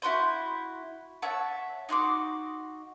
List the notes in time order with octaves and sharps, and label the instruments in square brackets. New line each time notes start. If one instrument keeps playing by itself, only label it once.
[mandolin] E4 F#4 C6 G6
C#5 E5 F#5 A5
D#4 F#4 C6 D6